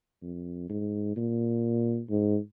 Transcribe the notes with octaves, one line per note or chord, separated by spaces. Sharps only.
F2
G#2
A#2
G#2